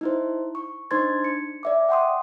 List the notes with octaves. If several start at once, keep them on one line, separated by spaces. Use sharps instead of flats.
D#4 E4 C5
C#6
D4 D#4 C5 C6 G#6 A6
C#7
D5 E5 D6
F#5 G5 C6 D#6